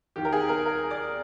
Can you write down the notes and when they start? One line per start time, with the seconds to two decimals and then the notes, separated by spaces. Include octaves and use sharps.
0.16 D#2 D#3 G4
0.25 A#4
0.33 G#4
0.49 A#4
0.66 A#4
0.91 D5